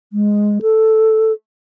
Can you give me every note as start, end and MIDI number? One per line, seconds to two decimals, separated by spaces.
0.13 0.59 56
0.62 1.32 69